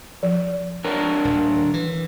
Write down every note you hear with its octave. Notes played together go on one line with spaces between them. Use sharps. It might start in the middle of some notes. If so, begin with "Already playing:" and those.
F3
D4 A#4 C#5
D#1
E3